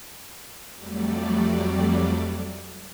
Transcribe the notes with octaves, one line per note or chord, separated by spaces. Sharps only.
F2 F#3 G3 A3 D5